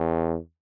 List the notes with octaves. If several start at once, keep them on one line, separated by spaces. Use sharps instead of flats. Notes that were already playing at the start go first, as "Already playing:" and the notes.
Already playing: E2